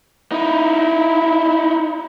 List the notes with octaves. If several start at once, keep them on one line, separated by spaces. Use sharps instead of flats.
D#4 E4